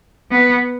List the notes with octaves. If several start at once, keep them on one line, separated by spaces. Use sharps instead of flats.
B3